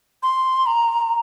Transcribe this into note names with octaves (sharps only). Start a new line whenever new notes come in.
C6
A#5